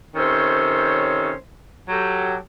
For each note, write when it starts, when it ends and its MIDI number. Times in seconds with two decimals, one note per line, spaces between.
0.16 1.32 48
0.16 1.32 51
0.16 1.32 61
0.16 1.32 69
0.16 1.32 72
0.16 1.32 73
1.89 2.35 54
1.89 2.35 67
1.89 2.35 69